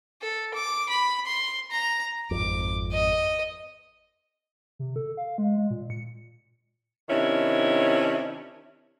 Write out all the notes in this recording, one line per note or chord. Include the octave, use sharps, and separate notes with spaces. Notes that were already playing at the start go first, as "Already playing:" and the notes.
A4
D6
B5
C6
A#5
G#1 F2 D6
D#5
C3
A4
F5
G#3
G#3
A#2
C#7
C3 D#3 C#4 D4 E4